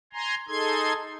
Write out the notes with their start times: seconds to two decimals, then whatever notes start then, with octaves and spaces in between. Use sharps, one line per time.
0.13 G#5 A#5 C6
0.48 D#4 G#4 A4 C6 G#6